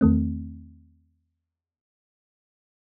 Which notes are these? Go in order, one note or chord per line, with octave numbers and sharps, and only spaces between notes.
E2 D#3 A3 C4